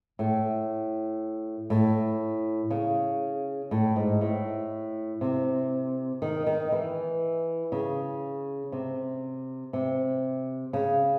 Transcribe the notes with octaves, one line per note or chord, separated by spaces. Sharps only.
A2
A2
C#3
A2
G#2
A2
C3
D#3
D#3
E3
C#3
C3
C3
C#3